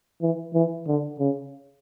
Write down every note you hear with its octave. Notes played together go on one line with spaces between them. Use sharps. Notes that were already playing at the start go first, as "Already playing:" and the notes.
E3
E3
D3
C#3